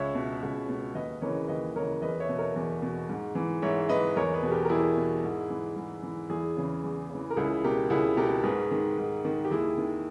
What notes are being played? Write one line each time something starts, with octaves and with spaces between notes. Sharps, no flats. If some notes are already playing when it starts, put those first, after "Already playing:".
Already playing: C#2 C#5 E5
B2
C#2
B2
D#2 B4 D#5
C#3 E3 A#4 C#5
D#2 B4 D#5
C#3 E3 A#4 C#5
E2 B4 D#5
C#5 E5
B2
A#4 C#5
E2
B2
G#2
E3
G#2 C#5 E5
E3 B4 D#5
E2 A#4 C#5
G#4 B4
B2
G4 A#4
A#4
E2 E4 G#4
B2
G#2
E3
G#2
E3
E2 E4 G#4
C#3 E3
E2
C#3
E3
A#4
C#2 E4 G#4
B2 G4 A#4
C#2 E4 G#4
B2 G4 A#4
G#2 G#4 B4
D#3
G#2
D#3
G4
D#2 E4 G#4
D#3